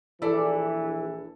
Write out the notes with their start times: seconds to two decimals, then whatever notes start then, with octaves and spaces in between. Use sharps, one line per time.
0.22 A#1 E3 E4 A4 D5